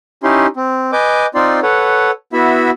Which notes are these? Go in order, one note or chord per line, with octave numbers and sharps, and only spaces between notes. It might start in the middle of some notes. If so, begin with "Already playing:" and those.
C#4 D#4 E4 G4 C6
C4
B4 D#5 G#5 D6 G6
C4 D#4 F4 D5 C6
A4 B4 C#5 F#5
B3 E4 F#4 E5 B5